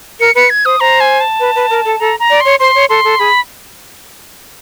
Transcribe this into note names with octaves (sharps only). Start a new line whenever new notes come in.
A#4 C#7
B4 C#7
G#6
C5 D#6
C5 A#5
G#5
A5
B4
B4
A#4
A4
A4 A#5
A#5
D5
C#5 C6
C5 C6
C#5
A4 C6
A4
G#4 B5